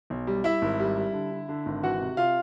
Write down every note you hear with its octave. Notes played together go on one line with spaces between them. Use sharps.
B1
G3
G3 E4 E5
G#1
G3
G3
D3
D3
D3
G#1
E3 F#4 F#5
C3
C3 F4 F5